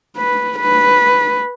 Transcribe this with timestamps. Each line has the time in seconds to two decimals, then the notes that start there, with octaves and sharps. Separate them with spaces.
0.17 B4
0.59 B4